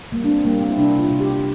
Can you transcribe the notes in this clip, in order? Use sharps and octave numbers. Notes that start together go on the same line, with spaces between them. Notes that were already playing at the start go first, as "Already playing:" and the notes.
G3 A#3
D4
C4
G3 A#3
C4
E4
C3 D4
F4
C3
G4